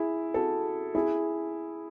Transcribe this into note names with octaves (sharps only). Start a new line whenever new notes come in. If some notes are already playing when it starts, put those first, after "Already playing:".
Already playing: E4 G#4
F#4 A4
E4 G#4